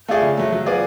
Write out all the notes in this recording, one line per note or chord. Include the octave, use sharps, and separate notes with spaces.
A3 F4 G#4 D5
C#3
F#3 A3
F#3
B3 F4 G#4 D5